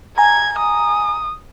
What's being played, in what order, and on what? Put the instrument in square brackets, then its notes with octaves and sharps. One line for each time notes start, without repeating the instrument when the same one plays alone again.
[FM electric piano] G#5 A#5 [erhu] G#6
[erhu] D#6